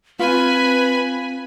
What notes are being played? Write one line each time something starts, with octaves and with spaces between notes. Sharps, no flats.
C4 F4 B4 G#5 B5